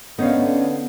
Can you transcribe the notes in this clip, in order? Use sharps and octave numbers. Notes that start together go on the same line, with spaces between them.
D3 B3 C#4 D#4 C#5 F5